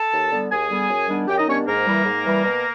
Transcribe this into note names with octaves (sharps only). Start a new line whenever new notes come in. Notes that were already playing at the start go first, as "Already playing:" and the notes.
Already playing: A4 A5
D#2
D3 G3 B3
D#2 G#4 G#5
D3 G3 B3
F#2
D#3 G3 B3 D4
F#2 G4 G5
D#4 D#5
D#3 G3 B3 C#4 D4 C#5
G#2 A#3 A#4
E3 G3
G#2
E3 G3
B2